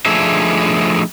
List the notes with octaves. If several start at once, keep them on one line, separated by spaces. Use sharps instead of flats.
F3 A3 D4 D#4 G#4 E5